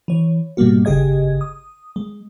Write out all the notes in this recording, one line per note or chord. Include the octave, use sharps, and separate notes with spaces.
E3 C#5
G#2 B2 G3 A#3 F#4
G1 C#3 G4 G#4 D#5 G#6
D#6
G#3